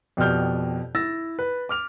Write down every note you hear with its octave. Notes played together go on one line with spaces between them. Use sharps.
F2 B2 G4 D5 F6 G6
E4 E6 A6 A#6
B4
D6 F6 F7